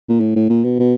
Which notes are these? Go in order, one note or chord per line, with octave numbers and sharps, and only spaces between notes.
A#2
A2
A2
A#2
B2
B2